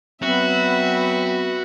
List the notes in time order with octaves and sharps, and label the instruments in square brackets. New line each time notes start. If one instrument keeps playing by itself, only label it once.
[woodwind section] F#3 B3 C4 [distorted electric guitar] F#4 [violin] B4 E5